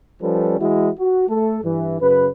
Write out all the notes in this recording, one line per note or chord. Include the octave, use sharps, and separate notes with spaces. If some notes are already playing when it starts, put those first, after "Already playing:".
F3 G3 C#4 A4 B4
E3 G#3 E4 F#4
F#4
A3 A4
G2 E3
F#2 C#3 B4